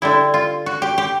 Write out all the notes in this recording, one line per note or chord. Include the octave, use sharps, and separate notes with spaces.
D3 G3 E4
F4
F#4
G4
G4